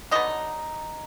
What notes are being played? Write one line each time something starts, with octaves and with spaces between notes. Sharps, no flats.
D3 F#3 B3 D#4 D#5